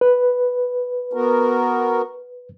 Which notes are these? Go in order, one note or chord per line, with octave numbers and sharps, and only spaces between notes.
B4
B3 F#4 A#4